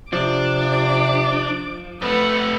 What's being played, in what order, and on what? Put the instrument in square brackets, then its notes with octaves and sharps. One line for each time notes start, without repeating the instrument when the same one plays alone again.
[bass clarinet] C3 [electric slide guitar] F3 [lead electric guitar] D4 [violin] D6
[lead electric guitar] F2 A3 [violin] B4 F#5